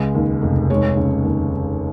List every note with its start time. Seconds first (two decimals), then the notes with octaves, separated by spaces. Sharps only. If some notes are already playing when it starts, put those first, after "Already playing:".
Already playing: C#2 G#3
0.15 D#2
0.42 F1
0.70 G#3 C#5
0.97 C#3
1.25 D#2